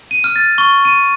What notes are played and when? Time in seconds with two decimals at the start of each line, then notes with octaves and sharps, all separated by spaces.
0.11 D#7
0.24 F6
0.36 A6
0.58 C#6
0.85 D#7